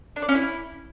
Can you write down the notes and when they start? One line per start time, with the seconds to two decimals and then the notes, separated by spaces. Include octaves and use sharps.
0.16 D4
0.22 D5
0.29 C#4
0.35 E4